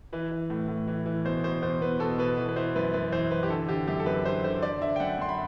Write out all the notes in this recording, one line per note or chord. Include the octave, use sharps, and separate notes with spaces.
E3 B4
E3
A2
A2
E3
E3
B2 C5
B2 C5
E2 C5
E2 B4
B2 A4
B2 B4
E3 B4
B4
E3 C5
F#2 B4
F#2 B4
E3 C5
E3 B4
G4
D3 A4
D3 G4
F#2 G4
A4
F#2 B4
D3 C5
D3 C5
D3 D5
D3 E5
G5
F#2 F#5
F#2 C6
B5